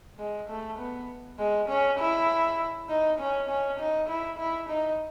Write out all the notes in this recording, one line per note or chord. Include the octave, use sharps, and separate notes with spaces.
G#3
A3
B3
G#3
C#4
E4
D#4
C#4
C#4
D#4
E4
E4
D#4